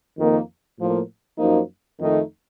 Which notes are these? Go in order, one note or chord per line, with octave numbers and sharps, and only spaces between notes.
F2 D#3 A#3 D#4
A2 F3 A#3
F#2 F3 A#3 D#4
F2 D#3 A3 D#4